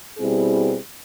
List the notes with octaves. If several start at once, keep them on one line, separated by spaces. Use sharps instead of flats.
B2 G3 C4 E4 G#4